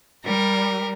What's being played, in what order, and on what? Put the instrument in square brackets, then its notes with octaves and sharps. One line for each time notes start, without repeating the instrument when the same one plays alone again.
[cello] G3 [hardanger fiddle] A#4